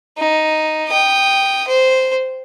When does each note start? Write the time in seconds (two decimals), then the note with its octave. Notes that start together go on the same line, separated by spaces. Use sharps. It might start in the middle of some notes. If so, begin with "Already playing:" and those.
0.18 D#4
0.89 G5 D#6
1.67 C5